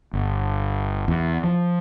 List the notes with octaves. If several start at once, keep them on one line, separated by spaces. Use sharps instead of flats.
G1
E2
F3